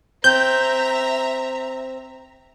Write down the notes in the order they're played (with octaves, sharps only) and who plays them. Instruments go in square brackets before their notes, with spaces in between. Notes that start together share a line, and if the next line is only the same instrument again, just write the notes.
[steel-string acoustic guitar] C4 [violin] E5 A#5 [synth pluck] G6